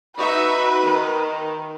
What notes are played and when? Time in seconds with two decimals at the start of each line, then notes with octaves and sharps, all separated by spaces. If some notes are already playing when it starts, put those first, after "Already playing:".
0.17 D#4 F#4 B4 E5
0.86 D#3